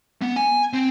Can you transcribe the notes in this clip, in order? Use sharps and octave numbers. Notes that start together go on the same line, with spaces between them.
B3
G#5
C4